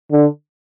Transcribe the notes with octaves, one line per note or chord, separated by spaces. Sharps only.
D3